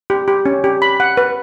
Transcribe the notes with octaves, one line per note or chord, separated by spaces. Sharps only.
G4
G4
C#4
G4
B5
F#5
B4